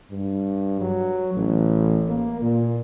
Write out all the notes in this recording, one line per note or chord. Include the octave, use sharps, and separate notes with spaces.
G2
F#3
A1
A#3
A#2